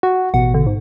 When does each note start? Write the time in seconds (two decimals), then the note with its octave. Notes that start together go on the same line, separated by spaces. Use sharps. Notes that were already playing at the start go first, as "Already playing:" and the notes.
0.03 F#4 F#5
0.34 A1 B2 F#5
0.54 D3
0.67 G#2